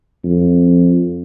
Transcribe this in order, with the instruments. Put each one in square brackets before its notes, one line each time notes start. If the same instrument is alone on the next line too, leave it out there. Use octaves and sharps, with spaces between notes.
[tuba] F2